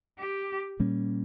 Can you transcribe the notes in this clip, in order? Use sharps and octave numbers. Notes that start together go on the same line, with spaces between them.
G4
A#2 G3 A#3 C#4